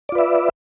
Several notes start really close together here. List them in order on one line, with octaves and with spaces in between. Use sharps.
D5 F4 B4 E5